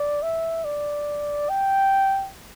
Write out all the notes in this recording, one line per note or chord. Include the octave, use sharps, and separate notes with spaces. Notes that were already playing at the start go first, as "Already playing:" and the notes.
Already playing: D5
E5
D5
G5